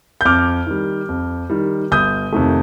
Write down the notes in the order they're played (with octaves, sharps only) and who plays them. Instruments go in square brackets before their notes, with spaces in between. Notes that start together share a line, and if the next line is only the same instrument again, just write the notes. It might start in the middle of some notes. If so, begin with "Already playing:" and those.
[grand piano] G6
F2 D6 F6
D#3 G3
F2
D#3 G3
G1 D#6 G6
F2 C3 D#3 A3